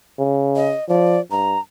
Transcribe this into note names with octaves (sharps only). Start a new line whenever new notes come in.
C#3
D#5
F3 D5
G2 A#5